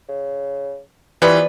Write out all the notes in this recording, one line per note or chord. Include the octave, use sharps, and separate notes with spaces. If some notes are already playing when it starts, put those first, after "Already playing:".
C#3
E3 F3 G3 B3 B4 D5